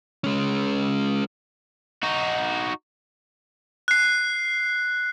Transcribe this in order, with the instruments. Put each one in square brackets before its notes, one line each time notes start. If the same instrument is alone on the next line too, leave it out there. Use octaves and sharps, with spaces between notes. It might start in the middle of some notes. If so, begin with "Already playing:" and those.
[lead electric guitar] G#3 C#4
[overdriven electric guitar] D#4 F#4
[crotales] F#6 C7